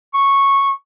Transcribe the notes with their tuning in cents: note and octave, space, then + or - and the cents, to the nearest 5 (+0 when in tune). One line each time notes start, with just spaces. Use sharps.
C#6 -10